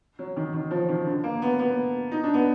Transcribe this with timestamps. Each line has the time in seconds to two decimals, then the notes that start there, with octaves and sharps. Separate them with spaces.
0.19 F#3
0.37 D#3
0.54 D#3
0.71 F3
0.89 D#3
1.06 D3
1.24 A#3
1.42 B3
1.59 B3
2.11 D#4
2.23 D4
2.34 B3